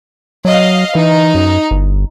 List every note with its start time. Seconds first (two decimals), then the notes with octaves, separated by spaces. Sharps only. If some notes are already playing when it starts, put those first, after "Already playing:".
0.45 F#3 D#5 F5
0.95 E3 D#4
1.35 F#2
1.71 G1